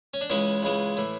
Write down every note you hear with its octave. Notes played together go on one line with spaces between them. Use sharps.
C#4
D4
C#2 C#3 E3 G#3 C#4 E4
C#2 C#3 E3 G#3
A2 E3